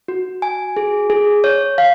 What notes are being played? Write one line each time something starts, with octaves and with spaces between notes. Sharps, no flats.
F#4
G#5
G#4
G#4
C#5
F5